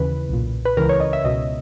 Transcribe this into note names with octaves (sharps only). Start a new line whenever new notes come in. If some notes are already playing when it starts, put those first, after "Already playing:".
Already playing: D#2 C#3 E3 B4
B1 A#2
B4
C#2 C#3 E3 A#4
C#5
D#5
E5
C#2 B2 D#5